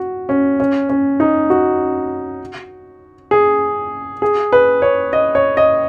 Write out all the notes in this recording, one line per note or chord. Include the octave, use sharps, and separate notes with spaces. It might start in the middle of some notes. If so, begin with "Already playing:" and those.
Already playing: F#4
C#4
C#4
C#4
D#4
F#4
G#4
G#4
B4
C#5
D#5
C#5
D#5